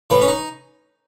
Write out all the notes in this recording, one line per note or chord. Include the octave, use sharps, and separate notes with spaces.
A2 E3 B4
C#4
D#4